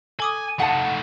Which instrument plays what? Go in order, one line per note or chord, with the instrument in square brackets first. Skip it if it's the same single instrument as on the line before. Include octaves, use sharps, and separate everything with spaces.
[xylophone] A4 D6 D#6 [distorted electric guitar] G#5
[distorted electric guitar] A3 D#4 [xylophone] F5 [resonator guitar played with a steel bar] F#5 A5